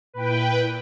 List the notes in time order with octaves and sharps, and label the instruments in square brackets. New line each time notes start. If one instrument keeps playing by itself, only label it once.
[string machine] A#2 E4 [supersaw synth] B4 G5